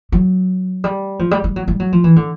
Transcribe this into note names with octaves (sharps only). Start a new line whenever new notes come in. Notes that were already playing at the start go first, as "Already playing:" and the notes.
F#3
G3
F3
G3
G3
F#3
G3
F#3
F3
E3
D3